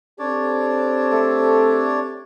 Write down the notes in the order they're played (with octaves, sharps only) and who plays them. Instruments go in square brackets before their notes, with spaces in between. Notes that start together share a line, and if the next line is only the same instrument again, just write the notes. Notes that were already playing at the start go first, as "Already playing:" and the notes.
[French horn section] C4 G4 A4 [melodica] D4 C#5 D5
[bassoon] A3